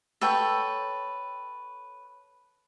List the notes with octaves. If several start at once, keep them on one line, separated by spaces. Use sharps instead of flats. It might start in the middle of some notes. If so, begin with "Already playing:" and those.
A4 B4 C#5 G5